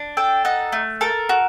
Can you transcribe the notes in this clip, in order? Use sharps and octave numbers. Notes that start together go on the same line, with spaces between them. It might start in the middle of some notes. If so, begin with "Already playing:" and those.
Already playing: D4
A4 G5
D#4 F#5
A3
A4 A#4
F#4